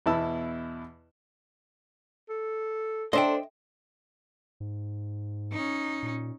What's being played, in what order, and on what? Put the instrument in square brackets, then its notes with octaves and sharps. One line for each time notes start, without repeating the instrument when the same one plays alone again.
[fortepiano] E2 B2 E4 A5 B5 E6
[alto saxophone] A4
[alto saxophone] D4 [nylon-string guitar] A4 C5 [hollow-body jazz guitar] D#5 E5 G5
[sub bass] G#2
[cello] C#4 D#4
[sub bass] A#2